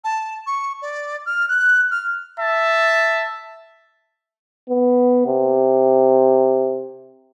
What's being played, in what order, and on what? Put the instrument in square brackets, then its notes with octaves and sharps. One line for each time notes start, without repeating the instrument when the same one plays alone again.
[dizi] A5
C#6
D5
F6
F#6
F6
[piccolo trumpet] E5 [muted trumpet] A5
[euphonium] B3
C3